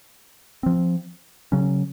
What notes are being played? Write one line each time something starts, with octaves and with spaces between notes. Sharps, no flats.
F3 C4
C#3 F#3 C#4